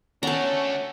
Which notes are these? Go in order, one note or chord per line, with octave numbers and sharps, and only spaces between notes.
A3 C#4 D4 F#5 A5 A#5